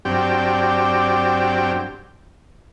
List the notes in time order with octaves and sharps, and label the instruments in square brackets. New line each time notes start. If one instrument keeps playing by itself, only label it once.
[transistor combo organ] G2 F#3 C4 D4 G4 G5